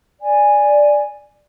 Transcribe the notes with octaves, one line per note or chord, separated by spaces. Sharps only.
D5 G#5